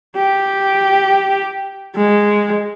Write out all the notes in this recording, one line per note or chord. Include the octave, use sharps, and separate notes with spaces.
G4
G#3